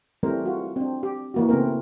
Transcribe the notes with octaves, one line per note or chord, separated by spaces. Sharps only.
E3 G3 A3 C4 A#4 C5
G3 F4 F#4
C4 D4
G4
E3 A#3 F#4
C#3 A3 B3 C4 A#4